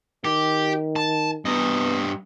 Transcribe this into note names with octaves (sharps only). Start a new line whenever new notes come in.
D#3 G4
A5
G2 B3 D#5